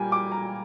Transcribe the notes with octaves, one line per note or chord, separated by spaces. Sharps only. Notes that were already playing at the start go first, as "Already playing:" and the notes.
Already playing: A#2 G3 A#3 G5 G#5
D6
A#5